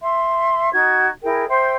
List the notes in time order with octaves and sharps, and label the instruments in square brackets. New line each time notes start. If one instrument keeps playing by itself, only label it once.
[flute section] E5 C6
D#4 F#4 G#6
E4 G#4 A#4 G5
C5 E5 G5 C6